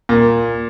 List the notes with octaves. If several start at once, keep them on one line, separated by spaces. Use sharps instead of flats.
A#2